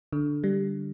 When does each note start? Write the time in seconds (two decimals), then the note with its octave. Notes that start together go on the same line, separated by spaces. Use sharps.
0.13 D3
0.44 G3